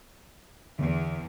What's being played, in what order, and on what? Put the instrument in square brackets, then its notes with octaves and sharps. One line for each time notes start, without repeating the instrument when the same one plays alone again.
[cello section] E2 [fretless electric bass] D3